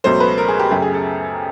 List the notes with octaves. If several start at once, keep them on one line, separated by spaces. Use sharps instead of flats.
C#2 B2 F#3 A3 C5
B4
A#4
G#4
G4
F#2 C#3 F#3 A3 G4
G#4
A4